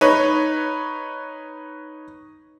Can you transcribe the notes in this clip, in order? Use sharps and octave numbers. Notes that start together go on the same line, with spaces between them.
D#4 B4 C#5